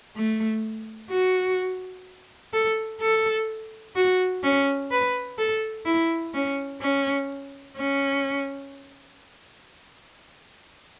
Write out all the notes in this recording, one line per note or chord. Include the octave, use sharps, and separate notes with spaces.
A3
F#4
A4
A4
F#4
C#4
B4
A4
E4
C#4
C#4
C#4